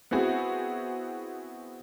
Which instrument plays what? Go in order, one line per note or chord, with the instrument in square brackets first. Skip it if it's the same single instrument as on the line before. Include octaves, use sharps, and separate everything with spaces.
[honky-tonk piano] B3 C4 E4 F#4 G#4